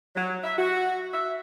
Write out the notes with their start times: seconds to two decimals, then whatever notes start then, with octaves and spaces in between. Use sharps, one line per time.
0.16 F#3
0.43 E5
0.58 F#4
1.13 E5